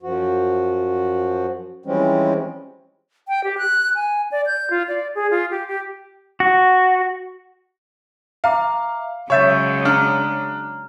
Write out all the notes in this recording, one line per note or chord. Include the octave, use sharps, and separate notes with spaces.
F#2 F3 F#4
E3 F3 G3 G#3 C4 C#4
G5
G4
F#6
G#5
D5
G6
F4
D5
G#4
F4
G4
G4
F#4
E5 F5 A#5 D6
C#3 F#3 G#3 C#5 E5 C#6 G6 A6
D4 A#5 F6